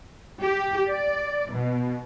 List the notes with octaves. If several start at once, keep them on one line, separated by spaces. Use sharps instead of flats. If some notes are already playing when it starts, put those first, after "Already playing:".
G4
D5
B2